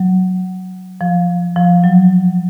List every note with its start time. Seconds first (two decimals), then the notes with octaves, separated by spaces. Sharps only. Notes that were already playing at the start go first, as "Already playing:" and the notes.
Already playing: F#3
1.01 F3
1.56 F3
1.84 F#3